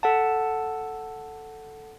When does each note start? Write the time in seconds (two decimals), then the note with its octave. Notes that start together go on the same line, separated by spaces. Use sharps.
0.03 A4 F#5 A5